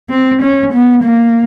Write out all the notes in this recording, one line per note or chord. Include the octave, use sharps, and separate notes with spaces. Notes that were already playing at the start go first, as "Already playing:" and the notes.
C4
C#4
B3
A#3